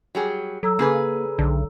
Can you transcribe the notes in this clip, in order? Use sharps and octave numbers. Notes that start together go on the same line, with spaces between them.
F#3 G3 G#4
F#3 A4 A#5 E6
C#3 A#3 G#4 B4
B1 D3